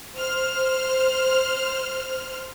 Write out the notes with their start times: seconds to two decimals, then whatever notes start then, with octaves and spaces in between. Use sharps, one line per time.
0.18 C5 F6